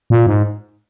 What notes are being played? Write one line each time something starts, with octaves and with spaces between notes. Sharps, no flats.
A#2
G#2